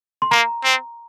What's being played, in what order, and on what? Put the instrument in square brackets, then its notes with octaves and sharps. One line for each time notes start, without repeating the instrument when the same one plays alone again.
[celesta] C6
[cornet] A#3 [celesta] A#5
[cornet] C4